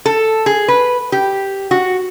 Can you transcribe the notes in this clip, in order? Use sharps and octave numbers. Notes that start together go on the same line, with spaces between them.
A4
G#4
B4
G4
F#4